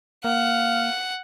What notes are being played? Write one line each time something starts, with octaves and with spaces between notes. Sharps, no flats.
A#3 F5 F#5